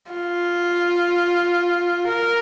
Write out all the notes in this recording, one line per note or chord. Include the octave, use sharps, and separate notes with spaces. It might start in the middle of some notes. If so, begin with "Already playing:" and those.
F4
A#4